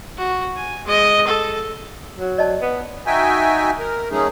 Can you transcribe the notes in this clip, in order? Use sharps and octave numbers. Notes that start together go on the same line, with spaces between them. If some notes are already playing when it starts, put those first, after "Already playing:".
F#4
G#5
G#3 D#5
A4
F#3
D5 D#5 A5
B3
D#4 F#4 E5 G5 G#5
A#4
F#3 A3 C#4 D#4 G#4